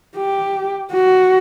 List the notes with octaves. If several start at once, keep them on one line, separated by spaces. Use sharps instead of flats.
G4
F#4